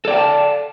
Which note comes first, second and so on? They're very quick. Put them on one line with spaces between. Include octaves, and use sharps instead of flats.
A4 D5 G5 F5 A5